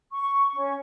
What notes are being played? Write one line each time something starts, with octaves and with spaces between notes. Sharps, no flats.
C#6
C#4